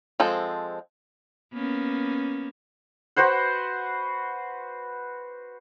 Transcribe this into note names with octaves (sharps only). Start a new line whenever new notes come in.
F3 G#3 C4 A4
A#3 B3 C#4
F#4 B4 C5 F#5